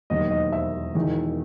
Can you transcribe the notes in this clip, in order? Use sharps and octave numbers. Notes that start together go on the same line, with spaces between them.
E1 D#2 D#3 F#3 D#5
D#5
E5
E1 E2 D#3